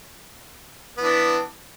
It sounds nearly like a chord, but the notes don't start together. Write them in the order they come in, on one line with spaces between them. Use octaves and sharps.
B3 E3 D4